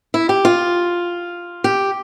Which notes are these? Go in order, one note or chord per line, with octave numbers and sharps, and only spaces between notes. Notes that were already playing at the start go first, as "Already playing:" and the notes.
E4
G4
F4
G4